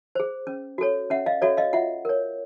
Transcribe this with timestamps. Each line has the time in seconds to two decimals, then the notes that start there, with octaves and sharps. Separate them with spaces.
0.15 G#4 C5
0.47 C#4
0.78 F#4 A4 C#5
1.10 C#4 E5 F#5
1.26 D#5 F5
1.42 F#4 A4 C#5 D5 E5
1.57 D#5 F5
1.73 F4 E5 F#5
2.05 A#4 C#5